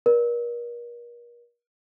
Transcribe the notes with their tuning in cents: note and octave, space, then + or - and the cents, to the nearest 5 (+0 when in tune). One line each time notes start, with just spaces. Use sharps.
A#4 +40 D5 +0